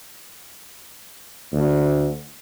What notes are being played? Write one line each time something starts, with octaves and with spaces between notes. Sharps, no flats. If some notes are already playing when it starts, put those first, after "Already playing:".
D2